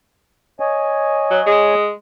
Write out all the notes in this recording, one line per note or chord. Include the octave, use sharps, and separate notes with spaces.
C#5 D#5 G#5
F#3
G#3